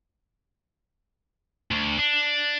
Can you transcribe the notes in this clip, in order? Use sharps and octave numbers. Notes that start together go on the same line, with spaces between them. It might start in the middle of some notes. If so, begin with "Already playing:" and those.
D2
D4